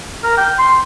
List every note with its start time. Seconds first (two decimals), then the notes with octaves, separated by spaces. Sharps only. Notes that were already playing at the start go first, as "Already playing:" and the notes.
0.24 A#4
0.38 G5
0.59 C6